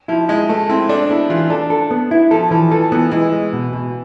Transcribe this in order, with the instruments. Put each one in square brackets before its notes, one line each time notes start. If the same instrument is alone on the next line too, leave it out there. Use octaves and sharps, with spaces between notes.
[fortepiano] F3 [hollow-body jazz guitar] E4
[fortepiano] G#3 [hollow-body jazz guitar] E4
[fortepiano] A3 [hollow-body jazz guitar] A4
[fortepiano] C4 [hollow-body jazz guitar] E4
[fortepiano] D4 [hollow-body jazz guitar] A4
[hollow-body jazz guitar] B3 [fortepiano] E4
[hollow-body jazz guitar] E3 [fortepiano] F4
[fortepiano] D4 [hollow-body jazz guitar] A4
[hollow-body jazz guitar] A4
B3
E4
[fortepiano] F3 [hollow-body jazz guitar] A4
[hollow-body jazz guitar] E3 [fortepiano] F3
[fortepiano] E3 [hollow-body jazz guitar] A4
[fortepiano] E3 [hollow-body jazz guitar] B3
[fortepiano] E3 [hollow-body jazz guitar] G#3
[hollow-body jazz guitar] G#3
B2
B2